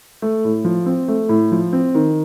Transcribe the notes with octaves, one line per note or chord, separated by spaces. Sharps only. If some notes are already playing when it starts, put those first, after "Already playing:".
A3
A2
F3
C4
A3
A2
F3
C4
D#3